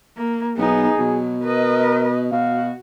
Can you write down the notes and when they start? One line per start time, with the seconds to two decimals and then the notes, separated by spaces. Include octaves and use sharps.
0.17 A#3
0.58 B1 B3 D#4 G#4
0.99 B2 F#3
1.44 A#4 B4 D#5
2.32 B2 F#4 F5